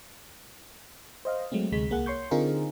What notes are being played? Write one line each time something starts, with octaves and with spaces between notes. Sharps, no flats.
C5 D#5 F5
F#3 G#3 A3 C4
D2 C3 G#3 B6
C2 A#3 G#4 F#5
C#5 C6 C#6 G6
D3 C4 D#4 F4 G#4 A#4